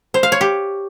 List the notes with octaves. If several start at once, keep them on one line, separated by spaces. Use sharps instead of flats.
C5
F5
C#5
G4